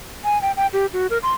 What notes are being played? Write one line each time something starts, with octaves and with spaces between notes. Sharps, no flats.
G#5
G5
G5
G4
F#4
A#4
C6